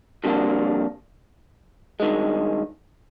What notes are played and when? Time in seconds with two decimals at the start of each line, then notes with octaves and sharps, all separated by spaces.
0.24 F2 D3 G3 A#3 D4
2.00 G2 D#3 G#3